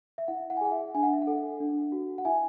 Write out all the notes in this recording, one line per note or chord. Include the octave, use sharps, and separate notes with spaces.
E5
E4 F#5
F#5
G#5
G#4 F#5
E5
D4 G#5
F#5
E5
F#5
A4
D4
F#4
F#5
E4 E5 G#5